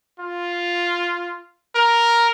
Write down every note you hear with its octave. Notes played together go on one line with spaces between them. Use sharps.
F4
A#4